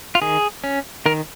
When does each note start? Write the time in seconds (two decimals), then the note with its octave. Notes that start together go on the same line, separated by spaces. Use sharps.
0.15 F4
0.22 D#3 G#4
0.64 C#4
1.06 D#3 A#4